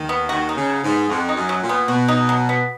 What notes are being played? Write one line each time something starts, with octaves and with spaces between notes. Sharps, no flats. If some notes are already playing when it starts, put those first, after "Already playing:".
Already playing: D#2 D#3
B3
D#2 D#3 F#4
D#4
C#3
F#3
G#2
B3
F2 F#4
D#4
F#2
F#3
A#2
B3
B2 F#4
D#4
F#3
B3